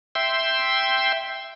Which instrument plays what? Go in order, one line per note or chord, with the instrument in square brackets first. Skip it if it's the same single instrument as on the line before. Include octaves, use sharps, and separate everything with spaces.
[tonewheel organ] E5 G5 C6